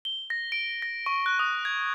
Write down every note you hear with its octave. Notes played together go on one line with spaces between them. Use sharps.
G7
A#6
D7
A#6
C#6
F#6
D#6
G#6